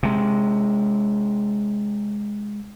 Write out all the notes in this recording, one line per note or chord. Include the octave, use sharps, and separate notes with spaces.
C3 G#3